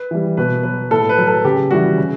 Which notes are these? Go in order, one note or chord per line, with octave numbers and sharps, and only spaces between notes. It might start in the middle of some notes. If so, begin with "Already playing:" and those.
Already playing: B4
E3 G3
B2 B4
F#3 B4
A2 A4
B4
F#3
A4
C#3 G4
E3 G3 F#4
C#3